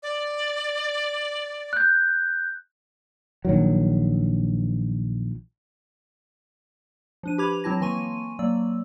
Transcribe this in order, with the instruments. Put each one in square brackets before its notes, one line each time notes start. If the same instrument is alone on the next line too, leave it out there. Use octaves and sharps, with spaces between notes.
[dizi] D5
[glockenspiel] F#6 G6
[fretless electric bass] A#1 D#3 F#3
[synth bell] F3 D4 D#7
G4 B4 B5 D6 G#6 F7
F#3 C4 E4 A5 A#6
E3 A#3 G#5 C6 C#6 D#7
F#3 A#3 D5 E6